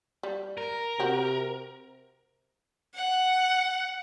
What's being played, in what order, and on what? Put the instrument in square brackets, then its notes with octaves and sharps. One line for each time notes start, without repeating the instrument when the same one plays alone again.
[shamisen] G3
[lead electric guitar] A#4
[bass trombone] C3 [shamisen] F#4 G4
[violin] F#5